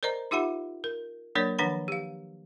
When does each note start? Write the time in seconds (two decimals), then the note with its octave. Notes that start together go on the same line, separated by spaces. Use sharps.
0.03 A#4 C5 D5 D#5 A#5
0.31 D#4 F4 G4 E5 F#5 B5
0.84 A#4
1.35 F#3 A#3 D4 A#4 C#5 D5
1.59 D#3 F3 D4 F#5 A#5 B5
1.88 G4 F5